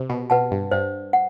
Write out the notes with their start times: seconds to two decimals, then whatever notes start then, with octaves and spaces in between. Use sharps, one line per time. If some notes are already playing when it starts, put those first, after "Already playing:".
Already playing: C3
0.09 B2
0.30 B2 B4 F#5 A5
0.51 G2
0.71 G2 C5
1.13 F#5